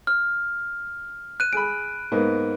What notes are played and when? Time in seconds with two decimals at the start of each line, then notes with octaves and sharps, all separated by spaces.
0.07 F6
1.40 F#6 D#7
1.53 G#4 B5 D7
2.12 G#2 A#3 B3